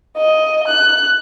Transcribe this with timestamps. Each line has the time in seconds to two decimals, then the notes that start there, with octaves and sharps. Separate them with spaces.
0.18 D#5
0.68 F#6